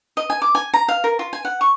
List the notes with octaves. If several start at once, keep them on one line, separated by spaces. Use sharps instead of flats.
D#5
G#5
D6
G#5
A#5
F5
A#4
F4
G#5
F#5
C#6